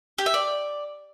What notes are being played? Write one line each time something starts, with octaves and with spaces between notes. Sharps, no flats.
G4
E5
D5